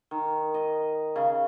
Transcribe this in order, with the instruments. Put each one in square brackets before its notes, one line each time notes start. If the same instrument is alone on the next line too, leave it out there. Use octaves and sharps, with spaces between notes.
[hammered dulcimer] D#3
D#5
C#3